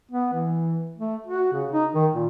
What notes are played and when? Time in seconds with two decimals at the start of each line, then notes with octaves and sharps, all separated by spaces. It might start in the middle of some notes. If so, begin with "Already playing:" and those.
0.11 B3
0.33 E3
0.97 A3
1.27 F#4
1.53 C#3
1.71 D#4
1.94 D#3
2.14 A#2